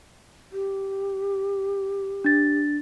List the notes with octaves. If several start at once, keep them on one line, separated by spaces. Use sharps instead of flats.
G4
D4 A6